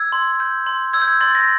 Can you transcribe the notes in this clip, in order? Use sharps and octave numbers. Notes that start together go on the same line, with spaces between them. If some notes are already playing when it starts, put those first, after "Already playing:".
Already playing: E6 G#6
C6
G6
C6
E6 G#6
G6
G#6
C6 A6
A#6